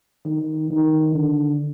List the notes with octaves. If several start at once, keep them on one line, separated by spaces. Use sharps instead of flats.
D#3
D#3
D3